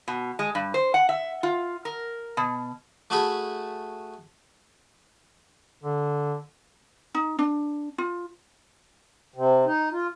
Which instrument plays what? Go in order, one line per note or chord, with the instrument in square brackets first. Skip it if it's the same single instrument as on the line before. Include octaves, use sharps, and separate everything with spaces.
[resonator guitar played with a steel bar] B2
G#3
G2
C5
F#5
E5
F4
A#4
B2
[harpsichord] A3 F#4 G#4 B5
[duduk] D3
[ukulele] D#4
D4
F4
[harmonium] C3
D#4
F4